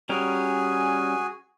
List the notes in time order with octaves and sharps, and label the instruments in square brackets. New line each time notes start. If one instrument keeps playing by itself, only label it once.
[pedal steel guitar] G3 C#4 A#4 [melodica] F#4 G#4 G#5